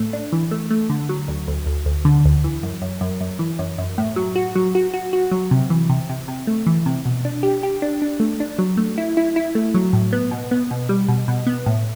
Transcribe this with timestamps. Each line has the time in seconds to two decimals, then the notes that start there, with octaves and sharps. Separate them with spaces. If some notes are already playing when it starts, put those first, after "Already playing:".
Already playing: A2 A3
0.13 D4
0.32 E3
0.51 A3
0.71 A3
0.90 D3
1.09 F#3
1.28 D2
1.48 D2
1.66 D2
1.86 D2
2.05 D3
2.25 D2
2.44 E3
2.63 F#2
2.82 F#2
3.01 F#2
3.21 F#2
3.39 E3
3.59 F#2
3.78 F#2
3.98 A2
4.16 F#3
4.35 F#4
4.55 F#3
4.75 F#4
4.94 F#4
5.13 F#4
5.31 F#3
5.51 C3
5.70 E3
5.90 C3
6.09 C3
6.28 C3
6.47 A3
6.66 E3
6.86 C3
7.05 B2
7.25 D4
7.43 G4
7.63 G4
7.82 D4
8.02 D4
8.20 A3
8.40 D4
8.58 F#3
8.77 A3
8.98 E4
9.17 E4
9.36 E4
9.55 A3
9.74 F#3
9.93 A2
10.13 B3
10.31 B2
10.51 B3
10.71 B2
10.89 G3
11.08 B2
11.28 B2
11.47 B3
11.66 A2